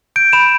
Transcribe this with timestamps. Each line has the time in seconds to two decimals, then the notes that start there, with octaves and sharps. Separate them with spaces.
0.16 G6 D7
0.33 B5 E7